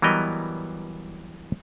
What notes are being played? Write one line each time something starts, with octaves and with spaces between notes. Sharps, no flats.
E3 F#3 G3 B3 A#4 D#5